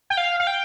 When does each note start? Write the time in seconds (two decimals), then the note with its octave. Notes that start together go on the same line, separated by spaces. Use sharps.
0.10 G5
0.17 F5
0.40 F5
0.47 G5